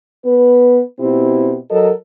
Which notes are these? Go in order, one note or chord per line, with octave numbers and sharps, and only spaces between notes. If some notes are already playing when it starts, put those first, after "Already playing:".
B3 B4
B2 C4 E4 G4
F#3 A4 A#4 D#5